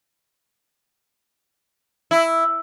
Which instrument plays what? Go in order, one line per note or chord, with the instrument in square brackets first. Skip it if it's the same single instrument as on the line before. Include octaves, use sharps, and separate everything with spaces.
[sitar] E4